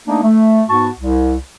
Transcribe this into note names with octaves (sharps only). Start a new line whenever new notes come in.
A3 A#3 D4 D#4
A3
G#2 B3 F#4 A5 C#6
C2